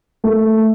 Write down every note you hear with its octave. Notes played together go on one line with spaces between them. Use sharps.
A3